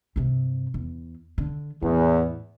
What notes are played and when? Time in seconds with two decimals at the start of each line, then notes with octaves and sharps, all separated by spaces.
0.16 G2 C3
0.74 E2
1.38 D3
1.82 E2 A2